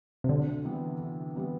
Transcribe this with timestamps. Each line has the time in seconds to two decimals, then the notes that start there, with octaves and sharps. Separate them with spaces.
0.24 C3
0.29 D2 D3
0.65 C3 E3 G3 B3
0.99 D2
1.35 C3 E3 G3 B3